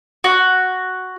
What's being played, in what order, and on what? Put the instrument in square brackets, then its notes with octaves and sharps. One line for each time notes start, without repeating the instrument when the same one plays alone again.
[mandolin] F#4